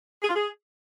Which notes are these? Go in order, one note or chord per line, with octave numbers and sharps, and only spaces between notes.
G#4
F4
G#4